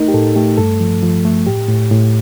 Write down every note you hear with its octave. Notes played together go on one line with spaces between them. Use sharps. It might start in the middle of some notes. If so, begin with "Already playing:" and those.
Already playing: A3 D#4 A#4
G4
A2 A4
A3 G4
G2 A4
F3
F3
A3
A2 G4
A2
A2